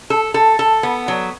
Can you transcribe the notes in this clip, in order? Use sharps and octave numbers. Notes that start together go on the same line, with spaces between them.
A4
A4
A4
B3
F#3